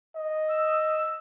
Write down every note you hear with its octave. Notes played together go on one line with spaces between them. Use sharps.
D#5
E6